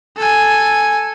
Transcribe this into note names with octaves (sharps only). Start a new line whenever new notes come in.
A4 G#5